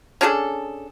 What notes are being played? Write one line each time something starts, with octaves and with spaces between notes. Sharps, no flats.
C#4 D4 G#4 A4